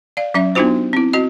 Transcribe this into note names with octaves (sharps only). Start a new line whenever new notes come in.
D5 F5
F#3 C#4 E5
B3 D4 D#4 F4 F#4 C5
C4 E4
C4 F#4 D#5